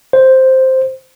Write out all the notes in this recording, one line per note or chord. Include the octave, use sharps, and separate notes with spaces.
C5